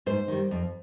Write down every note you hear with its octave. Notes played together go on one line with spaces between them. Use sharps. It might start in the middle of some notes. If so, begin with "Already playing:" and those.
G#2 C5
D#3 G3
F2